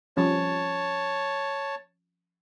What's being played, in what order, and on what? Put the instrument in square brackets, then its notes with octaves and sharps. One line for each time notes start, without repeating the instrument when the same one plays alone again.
[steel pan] F3 G3 C#4 [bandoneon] C#5 A5